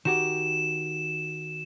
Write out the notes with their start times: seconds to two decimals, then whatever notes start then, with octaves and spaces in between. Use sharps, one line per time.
0.05 D#3 F#4 G4 E7